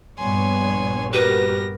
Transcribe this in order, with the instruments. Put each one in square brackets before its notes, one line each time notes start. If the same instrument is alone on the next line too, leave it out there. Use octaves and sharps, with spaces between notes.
[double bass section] A#1 G2 [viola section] B3 C#5 [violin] G#5 C6
[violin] B3 A#6 [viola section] F#4 G4 A#4 [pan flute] B4